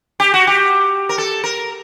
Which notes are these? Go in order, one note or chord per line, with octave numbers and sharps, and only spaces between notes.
G4
F#4
G4
A#4
A4
A#4